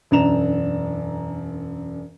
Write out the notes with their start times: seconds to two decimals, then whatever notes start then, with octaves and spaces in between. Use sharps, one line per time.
0.11 E1 F#2 D4 A#5 E7 F7